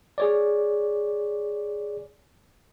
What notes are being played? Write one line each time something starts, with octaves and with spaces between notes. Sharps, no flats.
G#4 C#5 D5